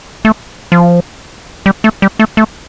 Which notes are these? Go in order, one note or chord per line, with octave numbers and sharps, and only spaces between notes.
A3
F3
G3
A3
G3
A3
A3